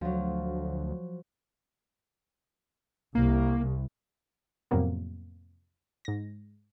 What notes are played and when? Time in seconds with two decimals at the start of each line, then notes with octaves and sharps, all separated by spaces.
0.01 D2 F3 F#3
3.15 C2 A#3
4.71 F2 A2 C3 F#3 A#3 B3
6.05 G#2 A#6